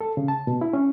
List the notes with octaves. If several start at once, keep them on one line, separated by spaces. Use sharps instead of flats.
A4
C#3
A5
B2
E4
C#4